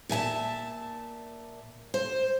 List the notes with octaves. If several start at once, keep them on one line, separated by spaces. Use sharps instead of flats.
A#2 E5 G#5 A5
C5